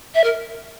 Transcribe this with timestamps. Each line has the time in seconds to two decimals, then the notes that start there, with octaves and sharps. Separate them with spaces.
0.14 E5
0.24 A#4